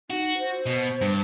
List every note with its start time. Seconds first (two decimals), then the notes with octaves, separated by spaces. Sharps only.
0.10 D#4 F#4
0.38 C5
0.66 B2
1.01 G2